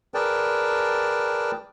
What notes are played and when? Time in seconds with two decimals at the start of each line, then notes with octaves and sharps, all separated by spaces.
0.14 G#4 A#4 B4 D5 G5 A5